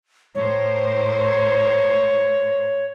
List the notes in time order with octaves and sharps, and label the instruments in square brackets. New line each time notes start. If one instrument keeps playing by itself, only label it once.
[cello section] A2 A#4 C5 [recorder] C#5